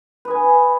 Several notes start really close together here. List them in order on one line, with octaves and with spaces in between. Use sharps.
B4 D#5 G#5